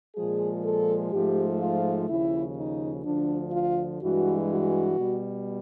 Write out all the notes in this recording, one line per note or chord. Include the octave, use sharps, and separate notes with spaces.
A#2 F3 G#3 G#4
A4
G#2 F3 A3 G4
F4
D#2 C#3 F3 E4
D#4
D2 D3 F3 D4
F4
G2 E3 G#3 F#4
F#4
B2 G3